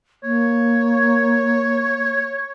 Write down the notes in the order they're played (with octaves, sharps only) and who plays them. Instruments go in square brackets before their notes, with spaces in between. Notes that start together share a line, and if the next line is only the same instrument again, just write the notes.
[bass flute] A#3 [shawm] C#5